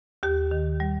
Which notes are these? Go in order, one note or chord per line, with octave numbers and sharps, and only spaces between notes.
D#2 G4
D#3
G3